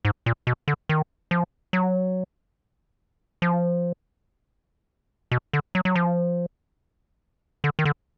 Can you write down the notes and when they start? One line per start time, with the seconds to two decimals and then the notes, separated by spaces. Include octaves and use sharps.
0.05 G#2
0.26 A#2
0.47 B2
0.68 D3
0.89 D#3
1.31 F3
1.73 F#3
3.42 F3
5.31 B2
5.53 D3
5.75 F#3
5.85 F#3
5.96 F3
7.64 D3
7.79 D#3
7.85 D3